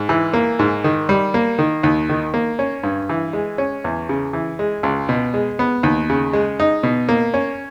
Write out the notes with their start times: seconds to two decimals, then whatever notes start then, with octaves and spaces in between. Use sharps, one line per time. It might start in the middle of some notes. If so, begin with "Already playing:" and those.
Already playing: G#2
0.09 E3
0.33 A#3
0.59 G#2
0.84 D#3
1.09 G3
1.34 A#3
1.59 D#3
1.83 D#2
2.09 D#3
2.34 A#3
2.59 C#4
2.83 G2
3.09 E3
3.33 G#3
3.58 C#4
3.84 E2
4.09 C#3
4.33 E3
4.59 G#3
4.83 C#2
5.09 B2
5.34 G#3
5.59 B3
5.83 D#2
6.10 C#3
6.33 G#3
6.60 D#4
6.83 B2
7.09 A#3
7.34 C#4